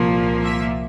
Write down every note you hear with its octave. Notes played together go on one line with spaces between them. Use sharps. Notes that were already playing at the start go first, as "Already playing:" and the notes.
Already playing: C2 A#2 F3 A#3
E5